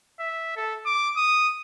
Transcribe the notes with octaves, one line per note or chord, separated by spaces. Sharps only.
E5
A4
D6
D#6